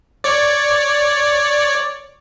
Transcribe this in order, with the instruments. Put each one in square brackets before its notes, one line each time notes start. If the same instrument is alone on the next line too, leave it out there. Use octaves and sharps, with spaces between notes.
[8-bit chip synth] C#5 D5